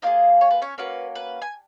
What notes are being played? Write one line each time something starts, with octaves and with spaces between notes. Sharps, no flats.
A#3 D#4 F4 G#4 D#5
C#5
B4
C#4 C#5
A#3 C#4 F#4 B4
B4
G#5